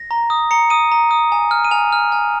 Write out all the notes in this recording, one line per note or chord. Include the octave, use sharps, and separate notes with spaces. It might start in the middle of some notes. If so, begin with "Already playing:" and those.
Already playing: A#6
A#5
D#6
A#5 C#7
D#6 D#7
A#5
D#6
G#5
F6
D#7
G#5 F7
F6
G#5